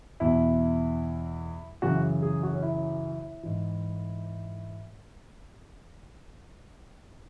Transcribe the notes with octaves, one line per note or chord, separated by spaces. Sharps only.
E2 B2 E4
F#2 C#3 E3 F#4
G#4
F#4
C#4
E4
G#2 E3